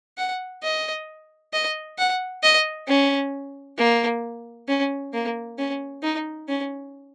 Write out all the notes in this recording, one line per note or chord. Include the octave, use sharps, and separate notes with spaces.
F#5
D#5
D#5
F#5
D#5
C#4
A#3
C#4
A#3
C#4
D#4
C#4